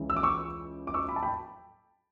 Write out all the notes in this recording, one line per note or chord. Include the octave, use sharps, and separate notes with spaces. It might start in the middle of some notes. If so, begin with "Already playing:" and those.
Already playing: C#2 C#3 E3
E6
D6
C#6 E6
D6
C#6 E6
B5 D6
A5
G5 B5